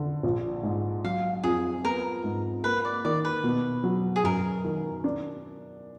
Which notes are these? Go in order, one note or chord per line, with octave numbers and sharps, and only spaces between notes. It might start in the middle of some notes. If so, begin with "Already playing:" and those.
Already playing: D3
A#1
G#2
F#3 F5
F2 G#4
B3 A#4
G#2
A#3 B4
D5
D#3 D5
B4
B2
F#3
G#4
F#2 A#4
D#3
D4